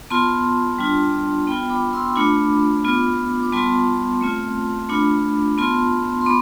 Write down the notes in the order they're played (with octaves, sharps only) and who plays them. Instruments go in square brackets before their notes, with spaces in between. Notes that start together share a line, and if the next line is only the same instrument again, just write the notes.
[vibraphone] B3 F4 A5 C6
G3 D4 F4
B3 F4 G5 B5
B5 D6
C6 E6
A3 D4 F4 B5 D6
B3 F4
D6
G3 B3 F4 A5 C6
A3 C4 F4
A3 D4 F4 B5 D6
B3 F4 A5 C6
C6
B3 B5 D6